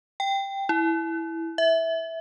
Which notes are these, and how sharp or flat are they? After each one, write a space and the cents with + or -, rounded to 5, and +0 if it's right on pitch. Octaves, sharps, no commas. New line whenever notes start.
G5 +5
E4 -5
E5 -10